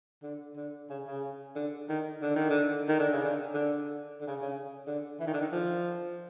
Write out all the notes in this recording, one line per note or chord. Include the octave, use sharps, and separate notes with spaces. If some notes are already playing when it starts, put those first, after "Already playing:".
D3
D3
C#3
C#3
D3
D#3
D3
D#3
D3
D#3
D3
C#3
D3
D3
D3
C#3
C#3
D3
E3
D#3
D3
D#3
F3